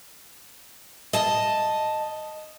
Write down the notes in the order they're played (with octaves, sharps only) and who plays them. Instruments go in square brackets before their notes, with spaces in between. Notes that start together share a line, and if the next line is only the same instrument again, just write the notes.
[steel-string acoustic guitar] D#5 A5